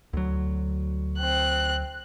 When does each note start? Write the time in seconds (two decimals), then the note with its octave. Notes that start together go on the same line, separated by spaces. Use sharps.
0.13 D2 F#3
1.19 C4 F#6